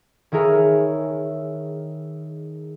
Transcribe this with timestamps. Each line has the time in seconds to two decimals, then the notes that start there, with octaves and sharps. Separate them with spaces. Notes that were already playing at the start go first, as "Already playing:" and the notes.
0.32 D#3 E4 G#4 A#4 C#5